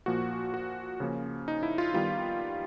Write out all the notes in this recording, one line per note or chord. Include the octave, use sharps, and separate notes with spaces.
A#2 F3 A#3 F#4
F#4
C#3 F3 A#3 C#4
D#4
E4
F4
D#3 G3 B3 F4